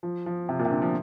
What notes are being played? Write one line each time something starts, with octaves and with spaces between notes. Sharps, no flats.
F3
F3
C3
A#2
C3
D3
F3